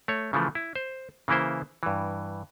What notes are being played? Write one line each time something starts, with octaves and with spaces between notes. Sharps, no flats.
A3 C#5
C#3 E3 F3 A3
E4
C5
C#3 E3 A#3 E4 C5
G2 E3